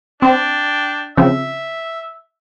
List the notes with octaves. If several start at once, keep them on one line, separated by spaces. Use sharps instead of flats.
C4 D4 G5
C#3 F3 C4 E5